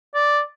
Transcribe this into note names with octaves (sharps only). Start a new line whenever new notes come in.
D5